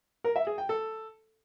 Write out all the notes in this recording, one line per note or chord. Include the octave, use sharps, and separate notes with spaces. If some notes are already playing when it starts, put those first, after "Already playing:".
A#4
E5
G#4
G5
A4